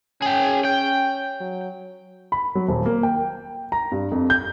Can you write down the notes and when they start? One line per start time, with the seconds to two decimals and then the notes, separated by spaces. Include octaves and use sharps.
0.22 C#4 G#4 G5
0.65 G5
1.41 F#3
2.32 B5
2.55 F#3
2.68 D#1
2.86 A#3
3.03 G5
3.72 A#5
3.92 G2
4.12 F2
4.30 G6